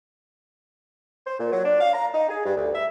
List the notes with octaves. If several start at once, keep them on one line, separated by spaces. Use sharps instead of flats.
C5
A#2
F#3
D4
F5
A#5
D#4
G#4
G2
D2
E5